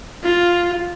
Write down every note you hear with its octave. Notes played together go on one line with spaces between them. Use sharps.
F4